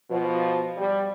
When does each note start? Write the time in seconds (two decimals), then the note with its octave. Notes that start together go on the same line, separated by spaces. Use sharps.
0.10 B2 F3
0.77 G3